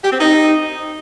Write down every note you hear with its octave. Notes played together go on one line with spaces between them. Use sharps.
G4
C4
D#4